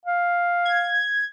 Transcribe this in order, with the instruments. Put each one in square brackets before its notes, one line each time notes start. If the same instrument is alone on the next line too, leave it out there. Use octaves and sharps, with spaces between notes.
[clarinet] F5
[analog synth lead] G#6